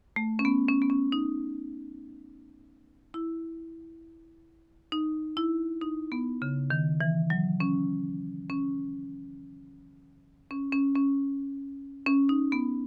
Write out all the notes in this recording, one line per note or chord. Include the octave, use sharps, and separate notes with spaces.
A3
C#4
B3
C#4
B3
C#4
D#4
E4
D#4
E4
D#4
B3
C#3
D#3
E3
F#3
C#4
C#4
C#4
C#4
C#4
C#4
D#4
B3